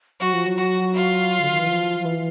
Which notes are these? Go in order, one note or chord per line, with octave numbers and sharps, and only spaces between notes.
F#3 F#4
F3
F#3
F#4
F4
D3
D#3
E3
F3
F3
E3